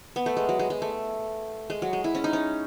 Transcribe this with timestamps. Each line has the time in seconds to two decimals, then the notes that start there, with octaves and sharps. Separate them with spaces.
0.16 B3
0.26 A3
0.37 G#3
0.49 F#3
0.59 G#3
0.70 G#3
0.82 A3
1.70 G#3
1.82 F#3
1.93 G#3
2.04 E4
2.15 C#4
2.24 D#4
2.33 C#4